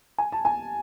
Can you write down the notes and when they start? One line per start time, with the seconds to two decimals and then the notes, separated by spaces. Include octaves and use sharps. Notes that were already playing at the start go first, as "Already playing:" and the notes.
0.18 G#5
0.32 A5
0.45 G#5